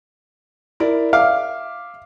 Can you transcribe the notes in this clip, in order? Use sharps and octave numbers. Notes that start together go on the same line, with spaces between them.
E4 A#4 D5
E5 F5 D6